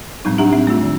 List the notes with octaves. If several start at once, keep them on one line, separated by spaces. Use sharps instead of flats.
A2 F#3 G3 C4 D#4
D4 G4 E5 F#5 A#5
C4 E5
A3 F4
D#3